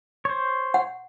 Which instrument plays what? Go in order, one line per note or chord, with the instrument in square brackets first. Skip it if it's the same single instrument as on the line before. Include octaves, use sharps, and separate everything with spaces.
[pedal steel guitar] C5 C#5
[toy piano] F#5